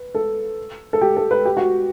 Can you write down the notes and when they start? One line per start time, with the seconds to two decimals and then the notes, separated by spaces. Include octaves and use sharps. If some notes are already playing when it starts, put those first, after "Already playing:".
Already playing: B4
0.15 A4
0.93 A4
1.01 G4
1.17 A4
1.31 B4
1.45 G4
1.57 F#4